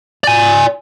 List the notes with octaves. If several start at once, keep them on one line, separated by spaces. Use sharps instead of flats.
D5 G#5